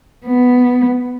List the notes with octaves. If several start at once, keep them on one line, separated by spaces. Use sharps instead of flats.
B3